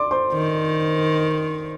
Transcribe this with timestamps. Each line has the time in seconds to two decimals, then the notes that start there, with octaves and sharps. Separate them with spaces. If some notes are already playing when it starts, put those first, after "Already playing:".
Already playing: D5 C6 D6
0.11 C5 C6
0.33 D#3